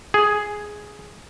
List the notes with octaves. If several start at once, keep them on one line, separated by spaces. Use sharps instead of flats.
G#4